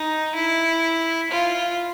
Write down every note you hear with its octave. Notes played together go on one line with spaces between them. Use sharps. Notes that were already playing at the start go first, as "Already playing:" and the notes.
Already playing: D#4
E4
F4